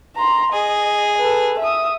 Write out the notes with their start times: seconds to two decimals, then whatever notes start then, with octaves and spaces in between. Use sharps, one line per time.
0.16 A#5 C6
0.53 G#4 D#5
1.18 A4 B4
1.59 E5 D#6